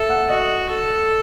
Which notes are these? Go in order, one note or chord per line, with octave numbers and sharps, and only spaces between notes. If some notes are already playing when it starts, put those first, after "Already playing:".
Already playing: A4 E5
F#5
F#4 D#5
A4